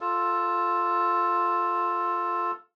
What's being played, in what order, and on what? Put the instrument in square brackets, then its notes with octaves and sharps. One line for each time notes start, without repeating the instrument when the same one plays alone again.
[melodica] F4 A4